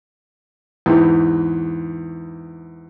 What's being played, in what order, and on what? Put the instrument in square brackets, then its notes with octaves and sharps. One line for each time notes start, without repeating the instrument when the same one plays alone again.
[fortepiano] E2 G#2 E3